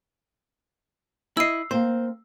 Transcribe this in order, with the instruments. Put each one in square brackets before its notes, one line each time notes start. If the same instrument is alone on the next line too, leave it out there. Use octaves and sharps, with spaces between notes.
[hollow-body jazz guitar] E4 D#5 [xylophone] E6 C7
[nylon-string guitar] A#3 C4 [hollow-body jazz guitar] C5